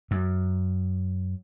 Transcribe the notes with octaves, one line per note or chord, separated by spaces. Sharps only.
F#2